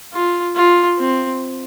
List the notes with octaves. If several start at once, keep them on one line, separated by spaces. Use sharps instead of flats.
F4
F4
C4